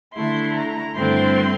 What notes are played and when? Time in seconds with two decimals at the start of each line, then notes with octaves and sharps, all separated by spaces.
0.14 D3 A3 E4 C6
0.55 A#5
0.96 G2 D3 A3 C4 E4 C6